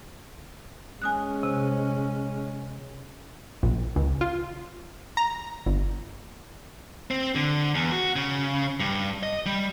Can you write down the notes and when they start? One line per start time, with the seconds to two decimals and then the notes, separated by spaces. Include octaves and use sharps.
1.02 G#3 C#4 G#5 D#6 F#6
1.43 C3
3.63 A#1
3.96 C#2
4.21 F4
5.17 A#5
5.66 G1
7.11 C4
7.35 D3
7.75 E2
7.91 F#4
8.16 C#3
8.80 G2
9.23 D#5
9.46 G3